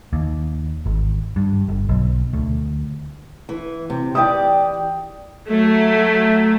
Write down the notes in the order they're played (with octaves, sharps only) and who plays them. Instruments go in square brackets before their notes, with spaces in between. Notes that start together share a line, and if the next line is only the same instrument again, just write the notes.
[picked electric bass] D#2
G#1
G2
G1
B1
D2
[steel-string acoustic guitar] E3
C3
[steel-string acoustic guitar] E3 G4 D5 [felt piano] G5 D#6
[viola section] F#3 A3